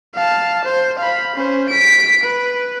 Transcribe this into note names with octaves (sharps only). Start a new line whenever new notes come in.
F5 A5
C5
F5 B5
C#4 C5
B6 D7
B4